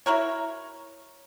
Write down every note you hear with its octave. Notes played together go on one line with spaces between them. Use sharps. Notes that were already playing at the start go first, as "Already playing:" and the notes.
E4 F#4 A#4 C#5